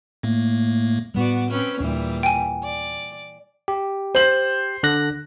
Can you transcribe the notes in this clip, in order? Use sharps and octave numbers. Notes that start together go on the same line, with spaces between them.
A2 A3 A#3
A2 G3 B3 F#4 D5
C4 C#4 B4
D#2 A#2 E3 G3 D4
G5 G#5
D5
G4
C5 F#7
D3 F#6 A#6